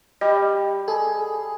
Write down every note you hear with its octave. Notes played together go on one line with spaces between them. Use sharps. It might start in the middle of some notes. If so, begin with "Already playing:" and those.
G3 D#5
G#4 A4